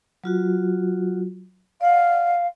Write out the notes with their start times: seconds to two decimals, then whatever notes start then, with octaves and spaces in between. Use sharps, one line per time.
0.24 F#3 F4 F#4
1.81 D5 F5 F#5